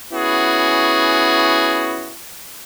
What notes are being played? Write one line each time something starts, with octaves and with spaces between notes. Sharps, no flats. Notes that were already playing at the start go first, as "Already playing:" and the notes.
B3 C#4 E4 F#4 G#4